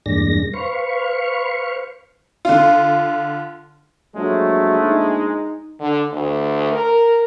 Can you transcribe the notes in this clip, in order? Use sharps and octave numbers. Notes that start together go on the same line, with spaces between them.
E2 G2 A#2 G#3 D4 A#6
B4 C5 F5 C#6
D3 F4
A#1 F#3 G#3 A3
D#4
D3
D2
A#4